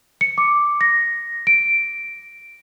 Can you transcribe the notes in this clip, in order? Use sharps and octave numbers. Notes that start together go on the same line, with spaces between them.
C#7
D6
A#6
D7